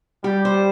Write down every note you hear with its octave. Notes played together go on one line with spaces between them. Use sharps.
G3 G4
C5